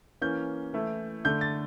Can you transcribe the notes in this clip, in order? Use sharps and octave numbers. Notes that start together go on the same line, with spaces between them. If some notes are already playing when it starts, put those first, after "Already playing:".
E3 A#3 C#4 G6
E3 A3 E4
D3 A3 D4 G6
A6